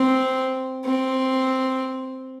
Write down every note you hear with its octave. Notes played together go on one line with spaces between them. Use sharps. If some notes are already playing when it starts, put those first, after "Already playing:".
Already playing: C4
C4